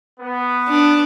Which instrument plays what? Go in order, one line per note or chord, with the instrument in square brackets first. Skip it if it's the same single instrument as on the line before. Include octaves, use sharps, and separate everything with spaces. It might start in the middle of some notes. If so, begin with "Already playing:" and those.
[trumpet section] B3
[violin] D4